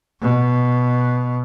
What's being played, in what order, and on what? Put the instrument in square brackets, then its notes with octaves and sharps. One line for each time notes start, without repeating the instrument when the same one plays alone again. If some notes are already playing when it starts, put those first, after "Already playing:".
[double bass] B2